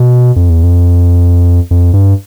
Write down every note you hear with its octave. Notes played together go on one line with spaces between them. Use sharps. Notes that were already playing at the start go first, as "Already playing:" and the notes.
Already playing: B2
F2
E2
F2
F2
G2